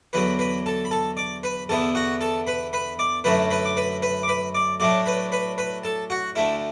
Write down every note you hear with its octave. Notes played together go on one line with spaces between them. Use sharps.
E2 D3 F#3 B4 B5
B4 B5
A4 A5
B5
A4 A5
D5 D6
B4 B5
E2 D3 B3 E4 A4 A5
F#4 F#5
A4 A5
B4 B5
B4 B5
D5 D6
F#2 D3 F#3 A3 B4 B5
B4 B5
D6
B4 B5
B4 B5
D6
B4 B5
D5 D6
A2 F#3 A3 D4 D5 D6
B4 B5
B4 B5
B4 B5
A4 A5
F#4 F#5
D2 D3 A3 E4 E5